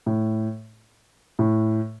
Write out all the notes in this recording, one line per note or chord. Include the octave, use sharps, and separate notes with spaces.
A2
A2